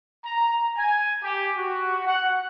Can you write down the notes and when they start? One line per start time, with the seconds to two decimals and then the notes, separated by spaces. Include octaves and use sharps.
0.25 A#5
0.78 G#5
1.23 G4
1.57 F#4
2.07 F#5